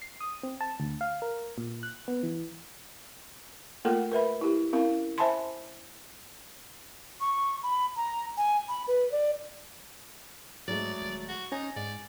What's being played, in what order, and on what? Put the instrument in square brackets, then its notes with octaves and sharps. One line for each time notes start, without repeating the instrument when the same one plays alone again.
[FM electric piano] C7
D#6
C4
A5
D2
F5
A#4
A#2
F#6
B3
E3
[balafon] A3 A#3 F4 A4 A#4 G5
A#4 B4 E5 B5
E4 G4
C4 C#4 E4 A#4 F5
C5 E5 G#5 A5 B5 C6
[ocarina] C#6
B5
A#5
G#5
B5
B4
D5
[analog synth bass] G#2 [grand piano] F#3 G#3 A3 [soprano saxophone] D5
[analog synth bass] D#1
[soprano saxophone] F#4
[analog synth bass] C#4 [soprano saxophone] D#4 [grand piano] G#5
[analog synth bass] G#2 [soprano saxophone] D5